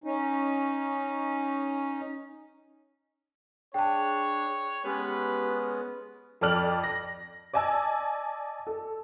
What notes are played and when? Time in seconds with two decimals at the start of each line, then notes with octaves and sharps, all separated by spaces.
0.04 C#4 D#4
3.74 D4 G#4 C#5 G5 A5
4.85 G#3 B3 C#4 G4 B4
6.41 F2 A4 D5 F6 F#7
6.84 A#6
7.53 D5 D#5 G#5 A5 E6
8.67 A4